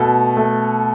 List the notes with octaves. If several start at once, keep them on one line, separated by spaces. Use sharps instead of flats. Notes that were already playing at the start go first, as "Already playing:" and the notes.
Already playing: B2 A3 A4
A3